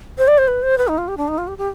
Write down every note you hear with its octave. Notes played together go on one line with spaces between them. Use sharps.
C5
D5
C5
B4
C5
B4
D#4
F4
G4
D4
D#4
F4
G4
G4